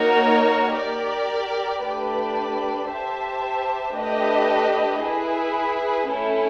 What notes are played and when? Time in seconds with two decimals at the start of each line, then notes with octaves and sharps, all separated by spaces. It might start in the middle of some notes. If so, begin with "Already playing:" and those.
Already playing: A#3 D#4 F#4 A#4 C#5
0.75 G4 A#4 D5
1.82 A3 D4 G4 B4 D5
2.90 G4 C5 E5 A5
3.96 A3 D4 G4 B4 D#5
5.03 E4 G#4 B4
6.11 A3 C#4 E4 A4